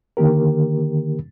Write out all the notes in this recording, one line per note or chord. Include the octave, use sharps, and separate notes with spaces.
D3 D#3 A#3 G4 A#4